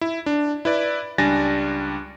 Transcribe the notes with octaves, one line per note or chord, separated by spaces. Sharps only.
E4
D4
E4 B4 D5
C#2 G3 D4 G#5 A6 A#6